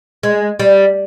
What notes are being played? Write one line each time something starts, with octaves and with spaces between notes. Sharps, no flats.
G#3
G3